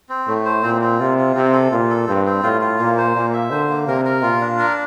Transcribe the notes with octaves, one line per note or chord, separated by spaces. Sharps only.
C4
A2 A3
C5
A#2 C4
C4
C3 F4
F4
C3 C4
A4
A#2 F4
A4
G2 C4
C4
A2 F4
F4
A#2 A#3
C5
A#2 A#3
E5
D3 C5
A#3
C3 A#4
A#4
A#2 F4
D4
A#4